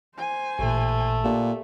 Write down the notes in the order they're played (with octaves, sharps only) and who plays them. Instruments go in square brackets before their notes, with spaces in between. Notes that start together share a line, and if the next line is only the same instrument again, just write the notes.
[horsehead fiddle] C5 G#5
[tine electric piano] A1 A#2 [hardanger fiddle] A3
[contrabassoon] A#2 [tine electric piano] G4